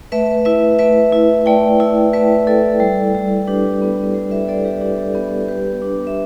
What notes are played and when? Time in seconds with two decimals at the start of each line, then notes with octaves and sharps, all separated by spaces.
0.12 A3 B4 E5
0.45 E4 B4 E5
0.79 A3 B4 E5
1.12 E4
1.46 A3 D5 G5
1.80 E4
2.13 A3 B4 E5
2.47 E4 A4 D5
2.80 G3
3.15 G3
3.47 D4 G4 B4
3.82 B3
4.15 G3
4.31 B4 E5
4.48 G3 A4 D5
4.65 G4 B4
4.81 D4 G4
4.98 A4
5.15 B3 G4
5.48 G3 G4 B4
5.82 D4
6.07 E5